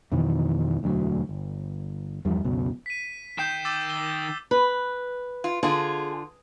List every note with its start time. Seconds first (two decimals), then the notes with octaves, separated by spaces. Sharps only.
0.12 F2 B2 D#3 E3
0.83 E1 D2 F3 F#3
1.29 G1
2.25 E2 G2 F3 G3
2.45 C#2 F#2 B2
2.86 B6 D#7
3.38 D#3 G5 G6 C7 E7
3.65 D6 E6 A6
3.90 G7
4.51 B4
5.44 F4
5.63 D3 F4 G#4